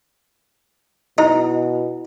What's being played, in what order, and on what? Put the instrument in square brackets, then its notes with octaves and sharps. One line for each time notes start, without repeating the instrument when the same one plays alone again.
[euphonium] B2 [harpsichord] D#4 [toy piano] E4